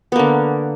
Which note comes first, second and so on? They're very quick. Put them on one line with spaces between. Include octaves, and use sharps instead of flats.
B3 A#3 D3